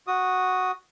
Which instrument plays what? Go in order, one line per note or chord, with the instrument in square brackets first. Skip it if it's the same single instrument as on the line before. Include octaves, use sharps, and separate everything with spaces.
[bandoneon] F#4 D#6